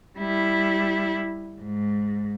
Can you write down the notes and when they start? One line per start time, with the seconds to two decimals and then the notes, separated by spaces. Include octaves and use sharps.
0.18 G3 E4
1.62 G#2